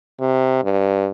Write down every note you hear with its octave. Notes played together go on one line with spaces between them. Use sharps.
C3
G2